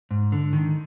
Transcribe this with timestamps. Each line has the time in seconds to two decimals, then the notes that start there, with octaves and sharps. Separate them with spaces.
0.11 G#2
0.32 D3
0.53 D#3